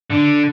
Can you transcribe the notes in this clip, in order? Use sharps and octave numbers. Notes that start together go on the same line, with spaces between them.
D3